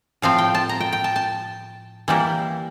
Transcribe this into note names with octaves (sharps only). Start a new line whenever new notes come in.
A2 F3 C4 F5
G5
A5
A#5
G5
G5
A5
A5
E3 G3 A#3 E4